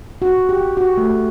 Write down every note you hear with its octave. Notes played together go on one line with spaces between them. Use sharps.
F#4
G4
F#4
A3